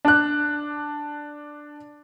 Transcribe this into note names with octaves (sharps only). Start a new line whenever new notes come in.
D4 F#6